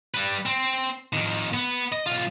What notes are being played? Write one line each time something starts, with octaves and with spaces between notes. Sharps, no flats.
G3 B4
C4
F2 D#3
B3
D#5
B1 F4